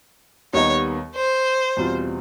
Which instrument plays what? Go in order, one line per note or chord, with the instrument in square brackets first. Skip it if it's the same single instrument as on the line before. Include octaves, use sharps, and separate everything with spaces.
[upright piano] D#2 D#3 G3 B3 D#4 [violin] C#5
[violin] C5
[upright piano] E2 B2 G3 C4 F4